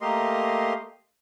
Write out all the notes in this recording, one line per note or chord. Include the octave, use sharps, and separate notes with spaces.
A3 A#3 G4 A#4 D#5 C6